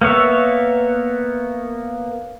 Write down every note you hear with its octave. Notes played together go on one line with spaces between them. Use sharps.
A#3 B3 C#5 E5